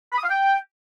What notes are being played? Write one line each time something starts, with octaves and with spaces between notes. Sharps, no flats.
B5
D#6
F5
G5